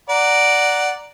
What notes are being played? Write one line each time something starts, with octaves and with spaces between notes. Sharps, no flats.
D5 F#5 A#5